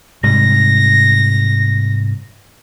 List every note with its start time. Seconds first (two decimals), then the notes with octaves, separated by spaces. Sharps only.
0.23 G#2 C3 G3 A#6